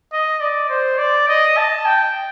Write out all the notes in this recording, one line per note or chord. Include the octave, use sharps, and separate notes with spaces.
D#5
D5
C5
D5
D#5
A5
G5